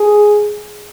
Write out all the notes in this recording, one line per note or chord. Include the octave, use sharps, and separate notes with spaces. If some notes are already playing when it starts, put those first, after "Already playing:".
Already playing: G#4